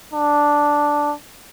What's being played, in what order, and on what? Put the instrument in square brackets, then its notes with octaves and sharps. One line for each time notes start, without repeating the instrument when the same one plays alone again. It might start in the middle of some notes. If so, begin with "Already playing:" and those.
[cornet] D4